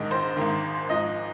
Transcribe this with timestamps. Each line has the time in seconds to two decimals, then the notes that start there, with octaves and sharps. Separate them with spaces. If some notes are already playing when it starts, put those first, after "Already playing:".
Already playing: A#1 G#2 D#3 G#3 D#5
0.11 C5
0.36 G#1 G#2 D#3
0.89 G#1 G#2 F3 D#5